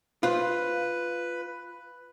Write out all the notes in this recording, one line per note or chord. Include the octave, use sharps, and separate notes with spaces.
F4 B4 C5